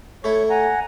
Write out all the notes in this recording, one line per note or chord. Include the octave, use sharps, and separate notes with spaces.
A3 E4 C#5 C#6
F#5 G#5 A#5